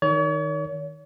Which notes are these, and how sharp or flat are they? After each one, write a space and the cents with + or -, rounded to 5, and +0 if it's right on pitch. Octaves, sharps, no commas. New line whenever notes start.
D#3 +0 C#5 +40